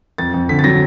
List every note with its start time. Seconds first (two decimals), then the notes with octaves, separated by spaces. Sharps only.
0.18 F2 A6
0.34 F2
0.49 D3 B6
0.59 A6
0.64 F#3 A#6